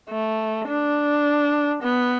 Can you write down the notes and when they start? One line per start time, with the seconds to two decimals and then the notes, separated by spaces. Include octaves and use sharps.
0.10 A3
0.68 D4
1.83 B3